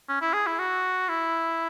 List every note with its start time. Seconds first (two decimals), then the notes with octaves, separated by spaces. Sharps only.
0.09 C#4
0.22 E4
0.34 G#4
0.47 E4
0.59 F#4
1.09 E4